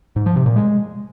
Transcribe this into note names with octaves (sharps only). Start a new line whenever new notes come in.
G#2
F3
C3
A#2
G#3